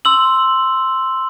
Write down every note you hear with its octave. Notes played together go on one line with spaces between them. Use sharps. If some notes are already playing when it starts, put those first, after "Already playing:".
C6 E6 F#7